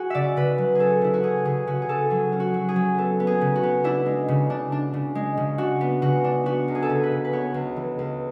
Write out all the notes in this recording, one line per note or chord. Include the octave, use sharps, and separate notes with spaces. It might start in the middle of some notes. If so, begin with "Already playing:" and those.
Already playing: F#4 G#4
C#3 D5 E5
C#3 B4
F#3
C#4 G#4 A4
C#3 E4
F#4
C#4 G#4
C#3 G#4
C#3 F#4
G#4
C#3 A4
F#3 G#4
C#4
F#4
F#3
G#4
F#3
B3 A4
B3
G#4
C#3
F#4
B3
D4 E4
G#3
C#3
D4
D4
C#3
G#3
C#3
D4 F#4
B3
C#3 F#4
D4
B3 F#4
C#2
G#4
A4
C#3 G#4
B4
C#3
B4
B3 C#5
C#2
E3
C#2